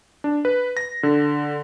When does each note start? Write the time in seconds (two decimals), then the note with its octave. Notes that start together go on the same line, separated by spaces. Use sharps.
0.24 D4
0.45 B4
0.77 A#6
1.03 D3